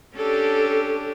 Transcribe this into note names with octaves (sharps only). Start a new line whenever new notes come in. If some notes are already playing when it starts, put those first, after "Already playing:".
C#4 D4 G4 A4